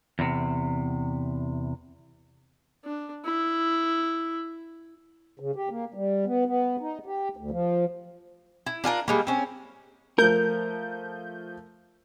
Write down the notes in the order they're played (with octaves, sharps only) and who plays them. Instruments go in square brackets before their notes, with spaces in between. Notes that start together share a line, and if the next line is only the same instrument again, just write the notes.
[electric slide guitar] E2 C3
[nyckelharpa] D4
E4
[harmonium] C#3
G4
A#3
G3
B3
B3
D#4
G4
D2
F3
[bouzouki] E4
D4 F4 G#4 A#4
G3 G#3 A#3
C4 C#4
[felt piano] F3 A3 [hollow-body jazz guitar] A#4 [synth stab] G6